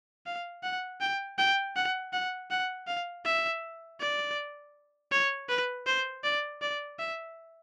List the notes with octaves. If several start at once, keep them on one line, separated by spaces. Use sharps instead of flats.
F5
F#5
G5
G5
F#5
F#5
F#5
F5
E5
D5
C#5
B4
C5
D5
D5
E5